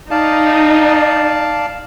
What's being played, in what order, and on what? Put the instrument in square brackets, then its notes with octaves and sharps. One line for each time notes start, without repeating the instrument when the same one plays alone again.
[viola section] D#4 [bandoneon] D5 F5 A5